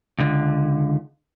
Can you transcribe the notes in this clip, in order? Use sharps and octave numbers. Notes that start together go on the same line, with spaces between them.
C#2 D3